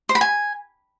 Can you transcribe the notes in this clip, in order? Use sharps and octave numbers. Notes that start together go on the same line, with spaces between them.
C5
B5
G#5